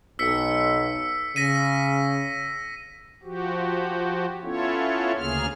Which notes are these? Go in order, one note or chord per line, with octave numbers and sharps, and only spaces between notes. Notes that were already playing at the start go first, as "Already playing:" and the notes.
B1 E6 B6 C#7
C#3 A#6 B6 D#7
F3 F#4 G4
B3 C#4 E4 F4 A4 C#5
D2 C#3 A#3 G#4 F6